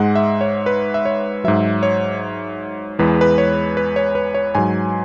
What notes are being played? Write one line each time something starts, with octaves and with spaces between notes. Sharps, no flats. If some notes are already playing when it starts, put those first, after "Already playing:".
Already playing: G#2 G#3 F#5
E5
C#5
B4
E5
C#5
G#2 F#3 E5
C#5
E2 E3 G#3 B4
B4
C#5
B4
C#5
B4
C#5
G#2 F#3 G#5